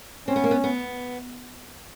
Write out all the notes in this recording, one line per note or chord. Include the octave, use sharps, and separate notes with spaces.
C4 C#4
B3
A#3
B3
B3